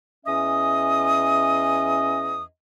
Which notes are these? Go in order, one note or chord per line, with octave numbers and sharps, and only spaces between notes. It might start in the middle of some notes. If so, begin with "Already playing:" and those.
E2 C#4 D#5 E5 D#6